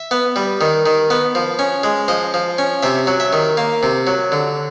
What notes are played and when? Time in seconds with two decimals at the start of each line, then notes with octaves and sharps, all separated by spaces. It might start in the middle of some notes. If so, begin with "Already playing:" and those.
Already playing: E5
0.11 B3
0.36 G3
0.61 D#3
0.86 D#3
1.10 B3
1.35 F3
1.59 C#4
1.83 G#3
2.08 F3 D#5
2.34 F3
2.58 C#4
2.83 C3 E5
3.07 F#3
3.20 E5
3.33 D#3
3.57 A#3
3.83 C3
4.07 F#3
4.32 D3